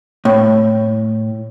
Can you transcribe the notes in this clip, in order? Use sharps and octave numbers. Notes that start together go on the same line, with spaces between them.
A2